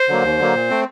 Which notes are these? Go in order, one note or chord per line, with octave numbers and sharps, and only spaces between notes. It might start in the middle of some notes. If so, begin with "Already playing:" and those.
Already playing: C5
D3 F#3 A#3
D#2
D3 F#3 A#3
A#2
A3 C4